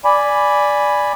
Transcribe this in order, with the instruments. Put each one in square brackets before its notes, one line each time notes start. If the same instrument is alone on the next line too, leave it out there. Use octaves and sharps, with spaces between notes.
[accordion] D5 G#5 B5